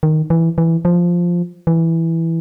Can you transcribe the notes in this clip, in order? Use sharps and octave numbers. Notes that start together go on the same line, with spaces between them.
D#3
E3
E3
F3
E3